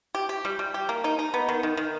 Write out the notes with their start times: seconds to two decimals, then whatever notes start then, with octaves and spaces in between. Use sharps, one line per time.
0.15 G4
0.29 G4
0.45 G3
0.59 G3
0.74 G4
0.89 A#3
1.04 D#4
1.19 D#4
1.34 B3
1.49 D#3
1.63 D#3
1.77 D#3